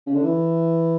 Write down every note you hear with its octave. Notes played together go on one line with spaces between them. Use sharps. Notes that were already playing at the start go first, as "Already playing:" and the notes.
C#3
D3
E3